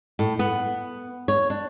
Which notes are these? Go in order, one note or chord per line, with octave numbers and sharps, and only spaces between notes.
A2
B3
C#5
D4